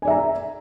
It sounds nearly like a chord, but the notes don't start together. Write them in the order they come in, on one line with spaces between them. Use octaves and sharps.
G#5 D5 E5 A#5